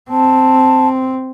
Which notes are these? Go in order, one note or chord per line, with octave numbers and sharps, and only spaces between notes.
C4 A5